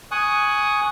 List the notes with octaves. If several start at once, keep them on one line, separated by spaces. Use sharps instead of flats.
G#5 C#6 D#6 F#6